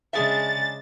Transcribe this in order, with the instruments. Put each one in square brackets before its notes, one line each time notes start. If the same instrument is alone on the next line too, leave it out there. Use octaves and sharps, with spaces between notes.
[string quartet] C#3 G#3 [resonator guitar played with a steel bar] D4 G#4 E5 [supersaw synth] A6